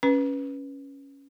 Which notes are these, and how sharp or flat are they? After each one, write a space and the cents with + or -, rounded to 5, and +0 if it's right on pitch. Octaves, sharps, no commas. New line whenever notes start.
C#4 +0 B4 -10